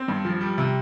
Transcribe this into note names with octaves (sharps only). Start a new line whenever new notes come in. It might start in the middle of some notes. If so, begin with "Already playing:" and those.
Already playing: C4
G2
F3
G3
C3